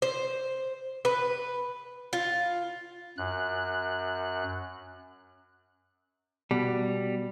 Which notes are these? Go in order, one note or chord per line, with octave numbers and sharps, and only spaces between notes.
C5
B4
F4
F#2 F#6
B2 G3